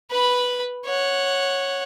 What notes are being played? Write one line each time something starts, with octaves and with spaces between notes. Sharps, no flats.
B4 B5
C#5 F#5